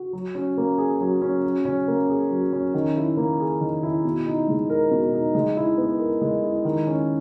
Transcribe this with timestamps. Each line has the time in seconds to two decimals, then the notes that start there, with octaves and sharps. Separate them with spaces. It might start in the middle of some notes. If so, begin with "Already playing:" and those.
Already playing: F#4
0.13 F#3
0.35 C#4
0.57 A#3
0.78 G#4
1.01 F#3
1.22 C#4
1.44 F#3
1.65 C#4
1.88 A#3
2.10 G#4
2.31 F#3
2.53 C#4
2.74 D#3
2.97 E4
3.17 A#3
3.40 G#4
3.61 D#3
3.83 E4
4.05 B2
4.27 D#4
4.49 G#3
4.70 A#4
4.91 B2
5.14 D#4
5.35 G#3
5.57 E4
5.78 B3
6.00 A#4
6.22 G#3
6.43 E4
6.65 D#3
6.87 C#4